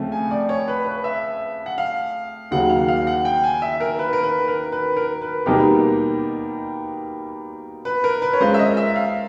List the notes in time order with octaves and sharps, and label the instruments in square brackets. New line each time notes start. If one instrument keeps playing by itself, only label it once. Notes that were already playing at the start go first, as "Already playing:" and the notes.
Already playing: [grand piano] C#3 F3 A3 C4
[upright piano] G#5
D5
C#5
B4
B4
E5
F#5
F5
[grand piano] D#2 C#3 F#3 A#3 C#4 [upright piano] F#5
[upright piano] F5
F5
F#5
G5
G#5
E5
A#4
B4
A#4
B4
A#4
B4
A#4
B4
[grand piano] B2 G3 A#3 D#4 G4 [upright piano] A#4
[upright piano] B4
A#4
B4
C#5
[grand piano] G#3 C#4 F4 A#4 [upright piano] C5
[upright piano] E5
D#5
E5
F5